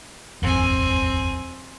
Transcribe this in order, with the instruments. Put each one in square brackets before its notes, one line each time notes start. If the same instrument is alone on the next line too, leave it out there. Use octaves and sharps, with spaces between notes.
[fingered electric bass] D#1 G#1 F2 [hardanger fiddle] C4 G#5